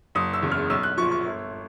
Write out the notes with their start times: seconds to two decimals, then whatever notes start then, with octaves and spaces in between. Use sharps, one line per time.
0.15 F#1 D#6
0.33 E6
0.43 E2 C#3
0.51 F6
0.70 B1 E6
0.83 F#6
0.97 F3 C#6
1.02 A#2
1.12 C#6
1.26 G1